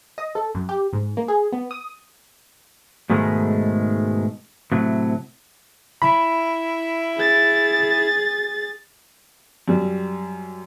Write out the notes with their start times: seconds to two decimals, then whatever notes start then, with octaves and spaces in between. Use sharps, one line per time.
0.18 D#5
0.35 A4
0.55 F#2
0.69 G4
0.93 G#2
1.17 A#3
1.28 G#4
1.52 B3
1.71 D#6
3.10 G#2 B2 D#3 G#3 A3
4.72 A2 C3 F#3
6.02 E4 B5
7.17 G#4 A6
9.68 F#2 G3